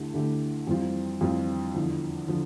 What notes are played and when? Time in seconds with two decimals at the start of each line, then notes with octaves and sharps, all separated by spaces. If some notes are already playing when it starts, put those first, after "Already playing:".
Already playing: D2 D3 A3 E4 G4
0.13 D2 D3 A3 E4 G4
0.67 F2 E3 G3 C4 F4
1.21 F2 E3 G3 C4 F4
1.74 E2 D3 F3
2.28 D3 F3